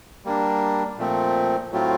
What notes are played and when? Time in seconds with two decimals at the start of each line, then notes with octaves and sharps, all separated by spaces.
0.25 G3 A#3 D4
0.98 A#2 F3 A3 C4
1.71 A2 F#3 A3 C4 F4